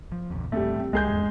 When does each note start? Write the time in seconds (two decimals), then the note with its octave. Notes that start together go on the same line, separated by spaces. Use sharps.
0.12 F3
0.31 A#1 E2
0.52 D1 G3 A3 C4
0.80 C4
0.93 C#2 G#3 G#4 G6
1.07 E2 G2